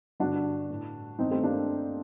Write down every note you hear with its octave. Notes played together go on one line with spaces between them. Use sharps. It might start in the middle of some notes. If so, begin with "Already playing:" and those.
G2 D3 D4 F#4
A2
G2 D#3 C4 D#4
A3 C4
A#3 D4